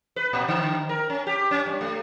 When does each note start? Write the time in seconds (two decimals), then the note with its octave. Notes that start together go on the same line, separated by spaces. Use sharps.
0.16 B4
0.33 A#2
0.48 D3
0.89 A#4
1.10 C#4
1.27 G4
1.51 C#4
1.66 G2
1.81 A3